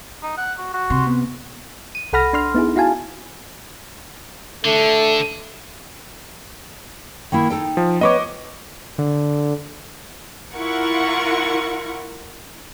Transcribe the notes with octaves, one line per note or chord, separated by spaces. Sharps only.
D#4
F#5
F#4
F#4
C3 C6
B3
D#7
C2 A4 F#5 B5 F6 A#6
D4 C6 F6
B3 D#4 E4 G#4
E4 F#4 F5 G#5 A5
D3 A3
D#3 A#3 E4
D#4 A4 G5
F3
B3 B4 C#5 D#5 C#6 D6
D3
E4 F4 A#4 F#5 C#6